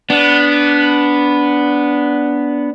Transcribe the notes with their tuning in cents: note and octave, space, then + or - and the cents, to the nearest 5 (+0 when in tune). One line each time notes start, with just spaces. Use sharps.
B3 +0 D4 -15